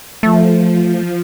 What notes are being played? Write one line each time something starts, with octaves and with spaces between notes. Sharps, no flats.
F3 A3